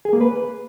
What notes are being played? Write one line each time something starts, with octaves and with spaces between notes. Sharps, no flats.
G#4
A#3
B4